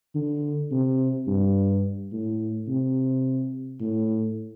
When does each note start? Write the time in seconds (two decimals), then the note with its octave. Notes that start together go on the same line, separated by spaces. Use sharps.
0.15 D3
0.71 C3
1.27 G2
2.12 A2
2.68 C3
3.80 A2